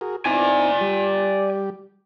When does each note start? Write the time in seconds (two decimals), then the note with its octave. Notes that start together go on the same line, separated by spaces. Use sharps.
0.01 F#4 G#4 A#4
0.26 C4 D#4 E4 D5 G#5
0.81 G3 G4